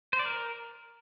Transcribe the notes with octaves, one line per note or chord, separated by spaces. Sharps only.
C5
D5
A#4